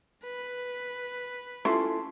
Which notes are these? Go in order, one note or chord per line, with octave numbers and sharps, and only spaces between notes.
B4
C#4 E4 F4 A4 C6